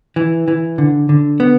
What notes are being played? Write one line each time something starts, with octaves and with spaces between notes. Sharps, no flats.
E3
E3
D3
D3
B3